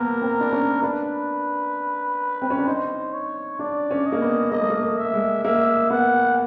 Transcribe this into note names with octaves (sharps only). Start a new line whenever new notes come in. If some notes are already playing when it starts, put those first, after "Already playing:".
Already playing: A#3 B3 A#4
C4
D4
C#4
D4 B4
C4
C#4
D4
D#4 C5
C#5
D4 D5
C#4
D#5
A#3
B3
A#3 D#5
A3
A#3
A3
E5
G#3
A#3 E5
B3 F#5